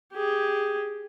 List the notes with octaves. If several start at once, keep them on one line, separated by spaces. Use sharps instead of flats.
G4 G#4